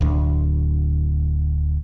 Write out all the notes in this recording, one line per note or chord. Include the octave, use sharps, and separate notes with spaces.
D1 D2